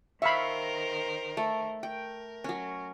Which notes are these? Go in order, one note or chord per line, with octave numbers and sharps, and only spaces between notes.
D#3 A#4 C5 E5 F5 B5 C#6
A3
A#4 G5
F#3 C#4